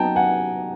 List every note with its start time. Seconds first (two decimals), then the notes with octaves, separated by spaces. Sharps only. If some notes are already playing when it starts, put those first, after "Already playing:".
Already playing: F#3 B3 D#4 G5 A5 A#5
0.16 F#5 G#5